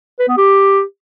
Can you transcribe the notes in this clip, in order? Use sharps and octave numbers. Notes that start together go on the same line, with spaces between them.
B4
B3
G4